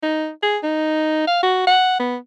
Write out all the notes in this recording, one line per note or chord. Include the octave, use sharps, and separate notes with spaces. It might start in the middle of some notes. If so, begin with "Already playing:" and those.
D#4
G#4
D#4
F5
F#4
F#5
B3